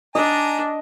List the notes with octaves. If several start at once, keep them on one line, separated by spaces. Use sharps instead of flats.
D4 D#5 G#5 A#5